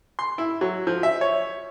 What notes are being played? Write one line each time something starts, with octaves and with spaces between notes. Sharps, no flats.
C6
E4
F#3
F3
E5
C#5